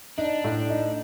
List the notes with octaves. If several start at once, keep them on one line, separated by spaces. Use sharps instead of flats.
D4 D#4
A2
D#4